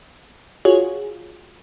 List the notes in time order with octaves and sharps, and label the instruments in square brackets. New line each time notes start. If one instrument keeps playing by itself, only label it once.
[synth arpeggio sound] F4 F#4 G#4 C#5